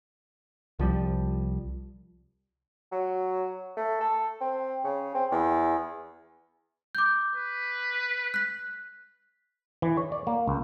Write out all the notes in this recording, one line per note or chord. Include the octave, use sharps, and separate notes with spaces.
C2 F3 G3
F#3
A3
A4
C4
C#3
C4
E2
D6 G6
B4
F#6 B6
E3
C#5
D5
A#3
C#2